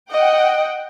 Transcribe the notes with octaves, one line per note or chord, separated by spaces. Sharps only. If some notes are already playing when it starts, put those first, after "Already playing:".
D#5 F#5 G5